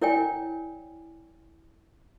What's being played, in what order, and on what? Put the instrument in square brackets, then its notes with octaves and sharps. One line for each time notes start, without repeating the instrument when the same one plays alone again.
[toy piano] E4 A#4 C#5 D5 G5 G#5